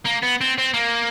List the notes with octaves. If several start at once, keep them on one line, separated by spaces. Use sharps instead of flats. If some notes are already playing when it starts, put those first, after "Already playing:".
A#3
B3
C4
C4
A#3